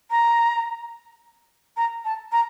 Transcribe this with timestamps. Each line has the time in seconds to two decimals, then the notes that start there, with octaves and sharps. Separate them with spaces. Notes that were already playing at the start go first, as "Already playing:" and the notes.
0.11 A#5
1.77 A#5
2.05 A5
2.32 A#5